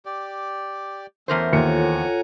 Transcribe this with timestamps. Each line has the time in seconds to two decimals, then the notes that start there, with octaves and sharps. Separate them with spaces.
0.05 G4 D5
1.28 E2 A3 C#4 A#4 C5
1.53 D#2 F4 A4 C#5 F#5 G#5 A#5 C#7